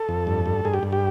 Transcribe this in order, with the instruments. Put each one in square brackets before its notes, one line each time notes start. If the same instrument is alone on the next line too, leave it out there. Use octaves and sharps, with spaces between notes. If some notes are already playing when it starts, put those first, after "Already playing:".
Already playing: [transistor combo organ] A4
F2
G2
G2
G2 G#4
G4
G2
G4